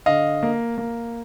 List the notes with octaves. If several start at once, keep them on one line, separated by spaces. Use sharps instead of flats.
D3 D#5 F5
A#3
A#3